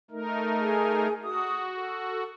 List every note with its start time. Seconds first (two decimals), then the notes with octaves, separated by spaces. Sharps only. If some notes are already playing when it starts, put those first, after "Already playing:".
0.11 A3 D#4 A#4
0.58 G#4 G#5
1.22 F#4 D#6
1.75 A4